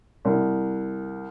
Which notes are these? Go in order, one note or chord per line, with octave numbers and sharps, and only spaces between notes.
C2